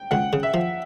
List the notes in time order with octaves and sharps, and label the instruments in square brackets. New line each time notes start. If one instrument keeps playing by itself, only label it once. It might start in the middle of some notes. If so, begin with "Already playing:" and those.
Already playing: [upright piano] G5
[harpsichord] C#2 [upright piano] F#5
[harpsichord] C#3
[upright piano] E5
[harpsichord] F3